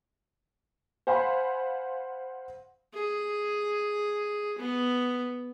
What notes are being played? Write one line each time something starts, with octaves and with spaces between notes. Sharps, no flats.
C5 F5 F#5 G#5 B5 C6
G#4
B3